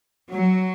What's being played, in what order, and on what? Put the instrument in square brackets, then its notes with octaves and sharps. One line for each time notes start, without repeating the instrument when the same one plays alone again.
[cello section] F#3